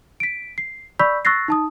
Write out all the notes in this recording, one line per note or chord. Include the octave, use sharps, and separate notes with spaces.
B6 D7
C7
D5 B5 C#6 E6 G6 B6
C#6 E6 F#6 A6 A#6 C7
D#4 A5 D#6